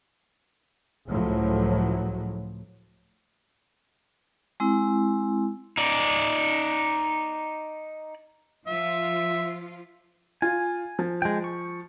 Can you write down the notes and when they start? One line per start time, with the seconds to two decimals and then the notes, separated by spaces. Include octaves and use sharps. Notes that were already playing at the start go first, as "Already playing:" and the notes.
1.08 C#2 A2 F3 F#3
4.60 G#3 C4 E4
5.77 D#4 D5
8.67 F3 F4 E5
10.42 F4 G#5
10.99 F3
11.22 G#3 G5
11.44 C#6